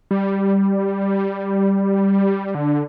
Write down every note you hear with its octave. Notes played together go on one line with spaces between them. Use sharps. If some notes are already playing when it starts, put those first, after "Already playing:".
G3
D3